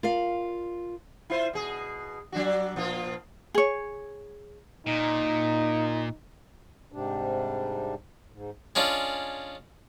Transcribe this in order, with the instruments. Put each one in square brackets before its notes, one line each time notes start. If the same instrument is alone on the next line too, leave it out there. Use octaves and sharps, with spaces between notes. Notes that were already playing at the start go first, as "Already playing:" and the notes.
[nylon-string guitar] F4 A#4 D5 F5
[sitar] E4 F4 C5
B2 G#4
F#3 D4 F#4
A#2 F3 F4
[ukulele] G#4 C#5
[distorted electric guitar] A#2 [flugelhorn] D#4
[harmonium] G#2 C3 G3 D4
G#2
[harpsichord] G#3 C#4 D4 F4